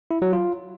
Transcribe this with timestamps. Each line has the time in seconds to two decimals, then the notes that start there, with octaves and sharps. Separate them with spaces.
0.11 E4
0.22 F#3
0.33 F4